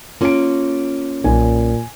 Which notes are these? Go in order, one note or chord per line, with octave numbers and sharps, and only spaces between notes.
A#3 C#4 F4 D7
B1 A#2 G#5